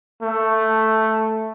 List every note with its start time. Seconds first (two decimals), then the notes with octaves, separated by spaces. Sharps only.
0.23 A3